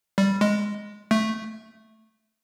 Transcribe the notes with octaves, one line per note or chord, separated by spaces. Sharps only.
G3
G#3
A3